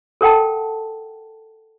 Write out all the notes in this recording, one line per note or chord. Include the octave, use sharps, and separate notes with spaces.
A4 A#4 F#5 G5 A5